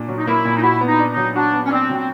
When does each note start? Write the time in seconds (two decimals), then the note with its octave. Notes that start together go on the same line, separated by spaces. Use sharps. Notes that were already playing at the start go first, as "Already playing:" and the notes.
Already playing: A#2 A#3 D4
0.08 F#3
0.18 D#4
0.27 A#3 E4
0.45 A#2
0.55 D#4
0.62 E4 F#4
0.81 B3
0.87 D#4
0.99 D4
1.12 F#3 D#4
1.35 D4 F#4
1.54 B3
1.65 C#4
1.71 C4 D4
1.90 F#3
1.97 C4